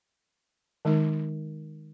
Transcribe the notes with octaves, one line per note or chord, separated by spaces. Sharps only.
D#3 G#3 D#4 A#4